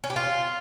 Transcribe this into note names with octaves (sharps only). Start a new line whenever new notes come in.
C#4
G4
F4